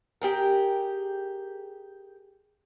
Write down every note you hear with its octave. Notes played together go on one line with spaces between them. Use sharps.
G4 G#4 A#4